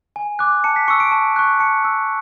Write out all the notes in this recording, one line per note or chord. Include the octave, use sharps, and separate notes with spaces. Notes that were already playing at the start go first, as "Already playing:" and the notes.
G#5
D6 F#6
A5 C#7
B6
C#6 E6 C#7
D7
A5
C#6 F#6
A5 C#7
E6